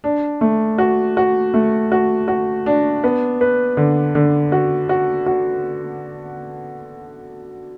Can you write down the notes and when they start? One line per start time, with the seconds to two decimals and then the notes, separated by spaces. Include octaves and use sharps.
0.04 D4
0.41 A3
0.78 F#4
1.17 F#4
1.54 A3
1.92 F#4
2.28 F#4
2.66 D4
3.04 B3
3.41 B4
3.77 D3
4.15 D3
4.52 F#4
4.89 F#4
5.26 F#4